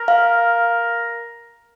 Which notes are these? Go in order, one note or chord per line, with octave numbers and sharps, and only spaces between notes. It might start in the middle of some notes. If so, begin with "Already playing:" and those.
Already playing: A#4
F5